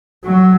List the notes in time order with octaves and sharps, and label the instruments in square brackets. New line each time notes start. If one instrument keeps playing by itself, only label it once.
[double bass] F#3